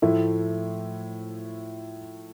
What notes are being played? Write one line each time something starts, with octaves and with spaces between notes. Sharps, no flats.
A2 F3 A3 E4